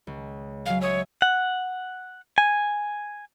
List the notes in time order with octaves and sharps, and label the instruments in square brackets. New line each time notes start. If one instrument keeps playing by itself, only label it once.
[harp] C#2
[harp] F#3 G#3 [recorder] F5
[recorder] C#5 [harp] E5 D#6 E6
[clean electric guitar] F#5
G#5